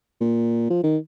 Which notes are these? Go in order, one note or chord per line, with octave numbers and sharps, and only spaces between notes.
A#2
F3
D#3